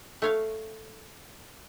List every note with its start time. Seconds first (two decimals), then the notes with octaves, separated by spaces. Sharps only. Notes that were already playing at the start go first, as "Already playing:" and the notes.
0.22 A3 C#5 F5